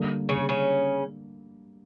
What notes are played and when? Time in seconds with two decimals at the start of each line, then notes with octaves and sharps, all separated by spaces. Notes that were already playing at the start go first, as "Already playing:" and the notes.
Already playing: D3 G3 A#3 D4
0.29 C#3 C#4
0.49 C#3 C#4